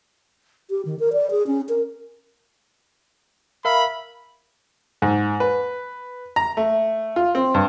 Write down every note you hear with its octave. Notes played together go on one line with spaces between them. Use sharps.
G4
D#3
A#4
D5
G#4
C#4
A#4
A#4 E5 F5 B5
G#2
B4
A#5
A3
F4
C4
G2